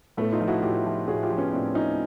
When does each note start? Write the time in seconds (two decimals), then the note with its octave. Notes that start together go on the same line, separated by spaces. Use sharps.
0.17 A2 A3 B3
0.33 D#4 F4
0.40 F3
0.48 E4 F#4
0.63 A2 F4 G4
0.85 F3
1.08 A2 F#4 G#4
1.23 F4 G4
1.30 F3
1.38 B3 C#4
1.53 A2 C4 D4
1.75 F3 C#4 D#4